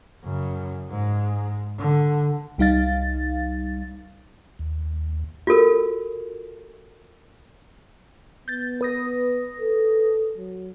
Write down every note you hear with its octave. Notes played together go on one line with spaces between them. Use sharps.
F#2 C#3
G#2 G#3
D3
C2 G3 D#4 F5 A6
D#2
F4 F#4 A4 A#4
B3 G6 A6
B4 D#6 A#6
A4
F#3